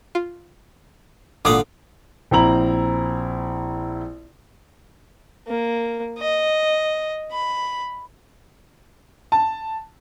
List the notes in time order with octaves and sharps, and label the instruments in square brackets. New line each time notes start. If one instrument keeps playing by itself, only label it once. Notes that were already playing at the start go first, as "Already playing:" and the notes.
[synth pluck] F4
[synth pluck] G#1 A#2 [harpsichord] D3 F5 F#5 [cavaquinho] D6 D#6
[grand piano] A#1 C4 E4 A#5 F#7
[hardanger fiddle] A#3
D#5
B5
[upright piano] A5